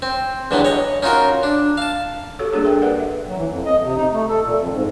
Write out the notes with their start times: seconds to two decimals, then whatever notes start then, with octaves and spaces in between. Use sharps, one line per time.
0.02 C4
0.51 E2 D3 E3 F#3 G3 B3
0.65 C#5 D#5
1.03 C#4 D#4 F4 F#4 A#4
1.43 D4
1.77 F5 A5
2.39 F#4 G4 A4 C#5
2.53 G3 A#3 D4 G#4 A4
2.65 A#4 E5 G5
2.82 G4 A#4 B4 D5 F#5
3.00 E5
3.25 F#3
3.37 E3
3.49 F2
3.65 D#5
3.83 C3
3.96 D#4
4.12 A3
4.28 A4
4.43 A#2
4.57 F2
4.72 G#2